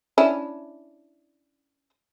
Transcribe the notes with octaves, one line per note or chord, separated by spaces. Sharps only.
C#4 D4 E4